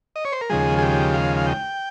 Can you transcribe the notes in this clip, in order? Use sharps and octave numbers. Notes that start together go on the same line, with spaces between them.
D#5
C#5
C5
A#4
D#2 C#3 F3 G#3 G#4
G#4
G4
F5
F5
G5